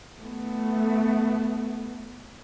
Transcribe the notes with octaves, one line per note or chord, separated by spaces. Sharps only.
A3 B3